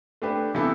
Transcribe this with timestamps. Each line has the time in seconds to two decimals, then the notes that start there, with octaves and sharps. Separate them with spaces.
0.22 A3 D4 G4 B4
0.54 C3 E3 B3 E4 A4